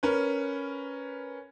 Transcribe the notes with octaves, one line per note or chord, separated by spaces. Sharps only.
C#4 A#4 B4